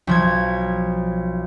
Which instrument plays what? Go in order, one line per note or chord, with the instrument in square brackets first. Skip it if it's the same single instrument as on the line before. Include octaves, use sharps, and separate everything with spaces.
[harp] B1 F3 G#6